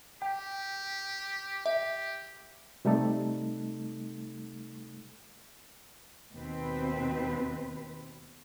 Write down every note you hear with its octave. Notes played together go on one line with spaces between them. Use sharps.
G4 G5
G4 E5
C3 G3 A3 D#4 A4
D#2 B2 C4 B4